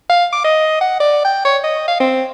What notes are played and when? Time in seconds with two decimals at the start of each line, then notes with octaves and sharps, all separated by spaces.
0.09 F5
0.32 D6
0.44 D#5
0.81 F#5
1.00 D5
1.24 G5
1.45 C#5
1.63 D#5
1.88 F5
2.00 C4